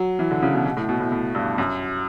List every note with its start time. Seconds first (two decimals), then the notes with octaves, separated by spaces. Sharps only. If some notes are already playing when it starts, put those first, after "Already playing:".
Already playing: F#3
0.19 E3
0.31 D3
0.42 C#3
0.54 B2
0.66 B2
0.77 A2
0.89 B2
1.00 A2
1.12 A2
1.35 G2
1.58 F#2